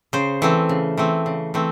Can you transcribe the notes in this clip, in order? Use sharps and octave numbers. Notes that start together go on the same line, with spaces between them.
C#3 C5
E3 A3 C4
C#3
E3 A3 C4
C#3
E3 A3 C4